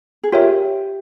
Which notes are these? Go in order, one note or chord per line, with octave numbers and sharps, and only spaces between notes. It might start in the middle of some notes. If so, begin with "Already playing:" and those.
G#4
F4 G4 A#4 C#5 E5